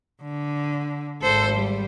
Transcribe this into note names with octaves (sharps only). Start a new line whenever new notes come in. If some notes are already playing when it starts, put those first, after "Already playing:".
D3
G#1 A4 C5
G3